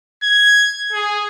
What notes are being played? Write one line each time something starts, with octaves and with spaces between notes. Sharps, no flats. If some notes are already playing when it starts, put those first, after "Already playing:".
G#6
G#4